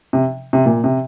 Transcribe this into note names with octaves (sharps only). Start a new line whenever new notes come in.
C3
C3
A#2
C3